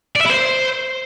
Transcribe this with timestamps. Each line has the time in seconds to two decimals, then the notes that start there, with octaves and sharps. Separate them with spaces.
0.16 D5
0.21 E5
0.26 E4
0.31 C5